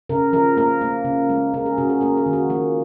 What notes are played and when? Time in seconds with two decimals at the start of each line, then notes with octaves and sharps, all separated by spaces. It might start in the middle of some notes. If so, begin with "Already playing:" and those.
0.09 C#3 A#4
0.33 F3 A#4
0.57 A#3 A#4
0.81 A#3
1.05 C#3
1.30 G#3
1.54 C#3 A#4
1.66 G#4
1.78 C#3 F#4
1.90 G#4
2.01 A#3 A#4
2.17 G#4
2.26 D#3
2.33 F#4
2.50 F3 A#3